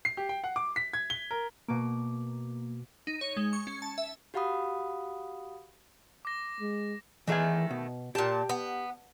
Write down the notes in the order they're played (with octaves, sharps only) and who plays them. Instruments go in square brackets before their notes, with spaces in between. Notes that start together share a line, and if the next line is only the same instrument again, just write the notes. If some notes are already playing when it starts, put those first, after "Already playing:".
[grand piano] C7
G4
G5
F#5
D6
B6
G#6
G7
A#4
[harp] B2 D6 [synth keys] A#3
[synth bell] D#4
C#5
G#3
C#6
C#4
A5
E5
[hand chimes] F#4 G4 F5 F#5 B5 D#6
[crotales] D6 A#6
[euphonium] G#3
[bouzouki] D#3 A3 [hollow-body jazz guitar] E3 G#4 G#5
[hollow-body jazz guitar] B2
[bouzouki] A#2 A5 [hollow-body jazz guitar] G4
[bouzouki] B3